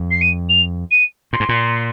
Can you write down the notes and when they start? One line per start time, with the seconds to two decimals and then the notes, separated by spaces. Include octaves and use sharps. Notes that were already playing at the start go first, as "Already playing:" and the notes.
Already playing: F2
0.11 C7
0.21 D#7
0.49 F7
0.91 D#7
1.33 A#2 C6
1.40 G#2
1.49 A#2